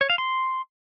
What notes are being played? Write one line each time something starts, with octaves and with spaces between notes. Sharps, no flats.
C#5
F5
C6